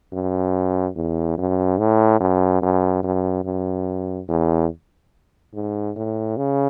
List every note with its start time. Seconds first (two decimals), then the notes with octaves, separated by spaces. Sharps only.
0.13 F#2
0.96 E2
1.38 F#2
1.78 A2
2.20 F#2
2.62 F#2
3.03 F#2
3.45 F#2
4.29 E2
5.54 G#2
5.96 A2
6.37 C#3